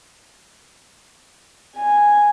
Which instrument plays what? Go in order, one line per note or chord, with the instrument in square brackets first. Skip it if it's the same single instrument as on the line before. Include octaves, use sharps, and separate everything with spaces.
[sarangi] G#5